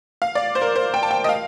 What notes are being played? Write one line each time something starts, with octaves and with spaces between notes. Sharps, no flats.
F5
D5
C5
A#4
C5
G5
A5
G5
D#5
F5